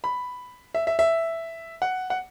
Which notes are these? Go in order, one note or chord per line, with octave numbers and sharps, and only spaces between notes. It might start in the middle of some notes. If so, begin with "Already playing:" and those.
B5
E5
E5
E5
F#5
F#5